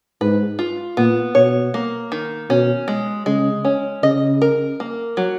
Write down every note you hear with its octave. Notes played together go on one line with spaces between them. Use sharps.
G#2 B4
F4
A#2 B3
B2 C#5
A#3
D#3
B2 C#4
G#3
C#3 G#3
C#4
C#3 D#5
A#4
A#3
F#3